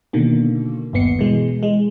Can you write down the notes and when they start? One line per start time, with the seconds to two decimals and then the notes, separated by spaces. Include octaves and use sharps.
0.13 B2 D3 D#3 A#3
0.93 G1 D#2 B3 C7 C#7
1.19 B2 E3 G#3
1.63 G#3